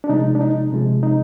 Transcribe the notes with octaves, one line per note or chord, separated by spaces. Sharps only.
D4
C3 F3 G#3 D#4
D4
D#4
C3 F3 G#3
D#4